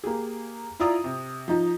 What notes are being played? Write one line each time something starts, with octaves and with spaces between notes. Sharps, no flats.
A#3 G4 G#4
E4 F4 D5 A#5 D#6
C3
F3 D#4